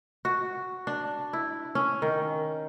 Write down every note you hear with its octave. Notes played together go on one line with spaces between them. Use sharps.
F#4
D4
E4
C#4
D#3